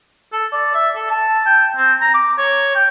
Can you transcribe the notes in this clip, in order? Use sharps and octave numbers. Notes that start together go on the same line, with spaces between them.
A4
D5
E5
A4
A5
G5
C4
A#5
D6
C#5
G5